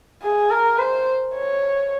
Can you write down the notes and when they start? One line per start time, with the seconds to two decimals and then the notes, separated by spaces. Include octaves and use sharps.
0.23 G#4
0.51 A#4
0.78 C5
1.34 C#5